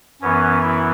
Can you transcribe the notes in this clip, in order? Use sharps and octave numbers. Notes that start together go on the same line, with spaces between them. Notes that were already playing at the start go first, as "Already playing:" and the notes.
F#2 E3 B3 C#4
E4